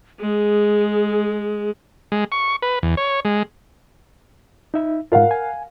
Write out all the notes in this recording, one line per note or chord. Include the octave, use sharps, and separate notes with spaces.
G#3 G#4
G#3
C#6
B4
E2
C#5
G#3
D#4 E5
G#2 F4 A#4 F5 F#5
G#5